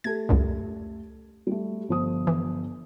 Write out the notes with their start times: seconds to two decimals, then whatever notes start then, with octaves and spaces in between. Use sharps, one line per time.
0.04 A3 G4 A4 G#6
0.29 C#2 F#2 A#2
1.47 G3 A3
1.88 G1 F3 D#6
2.27 E3